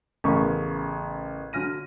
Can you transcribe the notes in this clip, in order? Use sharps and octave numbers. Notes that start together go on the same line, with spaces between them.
A1 C#3 B3 A#4 C#6
D3 F#3 G#5 F6 A#6 D#7